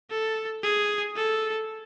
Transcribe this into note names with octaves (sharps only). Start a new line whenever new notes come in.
A4
G#4
A4